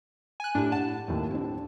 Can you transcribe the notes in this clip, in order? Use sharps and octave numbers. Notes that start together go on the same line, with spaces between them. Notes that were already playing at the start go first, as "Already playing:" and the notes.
G#5 F#6
A2 D4 G4
F#5 A5
D#2 A2
C4 D4